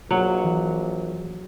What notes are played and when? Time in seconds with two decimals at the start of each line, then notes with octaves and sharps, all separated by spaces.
0.11 A#1 F#3
0.44 E3